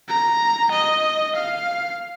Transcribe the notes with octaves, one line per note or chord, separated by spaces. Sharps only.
A#5
D#5
F5